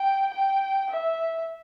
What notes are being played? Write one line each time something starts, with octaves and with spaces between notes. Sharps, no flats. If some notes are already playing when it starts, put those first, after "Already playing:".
Already playing: G5
G5
E5